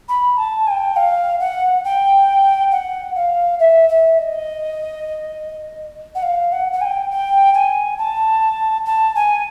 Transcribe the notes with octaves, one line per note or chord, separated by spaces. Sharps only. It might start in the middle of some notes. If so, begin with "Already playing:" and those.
B5
A5
G#5
G5
F5
F#5
G5
F#5
F5
E5
E5
D#5
F#5
F5
F#5
F#5
G#5
G5
G5
G#5
A5
A5
G#5